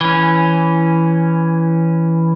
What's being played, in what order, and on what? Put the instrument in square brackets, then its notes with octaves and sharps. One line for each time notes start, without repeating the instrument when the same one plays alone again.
[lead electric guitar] E3 C#4